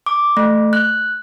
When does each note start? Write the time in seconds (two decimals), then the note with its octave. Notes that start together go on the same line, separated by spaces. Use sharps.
0.06 D6
0.37 A3
0.73 F#6